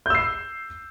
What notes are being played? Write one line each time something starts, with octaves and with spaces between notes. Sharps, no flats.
E6 G6 C7